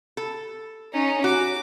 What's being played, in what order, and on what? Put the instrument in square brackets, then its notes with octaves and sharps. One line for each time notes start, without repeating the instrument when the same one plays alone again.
[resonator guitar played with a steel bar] A4
[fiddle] C#4 D#4
[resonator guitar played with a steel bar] F#4 [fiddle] D6